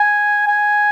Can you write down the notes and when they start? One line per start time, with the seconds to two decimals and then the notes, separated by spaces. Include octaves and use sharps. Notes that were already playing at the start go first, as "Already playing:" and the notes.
Already playing: G#5
0.48 G#5